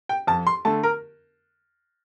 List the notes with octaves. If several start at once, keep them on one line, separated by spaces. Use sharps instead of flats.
G5
F2 A5
C6
D3 A3 A5
A#4